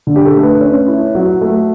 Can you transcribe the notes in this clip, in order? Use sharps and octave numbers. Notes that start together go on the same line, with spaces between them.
D3
G4
A4
A3
B4
C#4
E4
F#3
A3